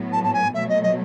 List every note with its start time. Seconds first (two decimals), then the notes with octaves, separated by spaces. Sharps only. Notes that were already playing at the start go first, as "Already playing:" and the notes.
Already playing: A2 F#3 B3
0.12 A5
0.23 A5
0.33 G#5
0.54 B2 F#3 A3 E5
0.69 D#5
0.82 D#5